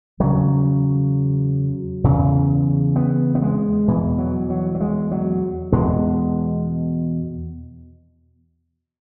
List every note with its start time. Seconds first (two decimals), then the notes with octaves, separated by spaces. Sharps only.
0.20 E2 C#3 F#3
2.04 E2 C#3
2.96 B3
3.35 B3
3.42 G#3
3.88 E2 B2 E3
4.18 F#3
4.50 F#3
4.75 F#3
4.80 G#3
5.11 F#3
5.72 E2 B2 G#3